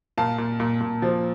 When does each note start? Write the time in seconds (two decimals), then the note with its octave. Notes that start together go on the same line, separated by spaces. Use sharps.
0.18 A#2 F5 A5
0.38 A#2
0.60 A#2
0.81 A#2
1.02 F3